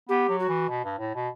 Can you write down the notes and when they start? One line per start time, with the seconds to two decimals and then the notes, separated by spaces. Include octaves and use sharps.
0.09 B3 G4
0.29 F#3
0.39 F#4
0.48 E3
0.69 B2
0.84 G2
0.99 A2
1.15 B2